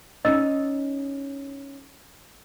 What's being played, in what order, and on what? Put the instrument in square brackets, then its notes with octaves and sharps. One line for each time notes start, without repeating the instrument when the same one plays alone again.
[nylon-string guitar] C#4 D#4 [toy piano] D#5 E6